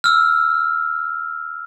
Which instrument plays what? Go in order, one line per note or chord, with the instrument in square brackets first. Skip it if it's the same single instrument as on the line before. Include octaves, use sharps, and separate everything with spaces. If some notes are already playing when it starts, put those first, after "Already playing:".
[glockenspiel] E6 F6